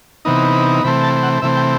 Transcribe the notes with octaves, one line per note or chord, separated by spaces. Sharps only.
C3 E3 B3 D#4
C3 E3 A3 C4 B5
A5
F#5
C3 E3 A3 C4 E5
G5